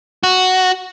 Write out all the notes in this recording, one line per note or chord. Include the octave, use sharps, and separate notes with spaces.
F#4